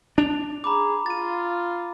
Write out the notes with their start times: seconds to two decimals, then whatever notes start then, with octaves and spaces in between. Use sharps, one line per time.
0.18 D4 F7
0.64 G#4 A#5 B5 D6
1.06 F4 A6 D#7